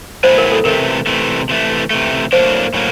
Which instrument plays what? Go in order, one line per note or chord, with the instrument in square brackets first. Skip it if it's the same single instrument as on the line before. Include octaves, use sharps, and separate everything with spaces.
[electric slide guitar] A2 F#3 B3 E4 G#4 [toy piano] C5
[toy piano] A#4
A4
[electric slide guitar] C3 E3 A3 [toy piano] A#4
[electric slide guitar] C3 E3 A3
C3 E3 A3
C3 E3 A3
[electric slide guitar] A2 F#3 A#3 D4 [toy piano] C5
[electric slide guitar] A2 F#3 A#3